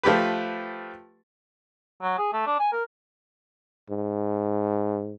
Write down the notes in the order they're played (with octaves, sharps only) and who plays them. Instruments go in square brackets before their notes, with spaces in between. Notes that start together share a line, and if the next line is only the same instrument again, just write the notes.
[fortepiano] F3 A3 G4 B4
[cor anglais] F#3
G#4
A3
D4
G#5
A#4
[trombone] G#2